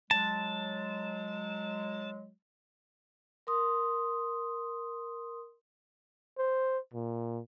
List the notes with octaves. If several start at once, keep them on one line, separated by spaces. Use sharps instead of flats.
F#3 G#3 A5
A#4 C6 D#6
C5
A#2